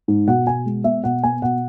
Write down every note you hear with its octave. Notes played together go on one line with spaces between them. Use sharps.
G#2
B2 F#5
B2 G#5
G#3
B3 E5
B2 F#5
B3 G#5
B2 F#5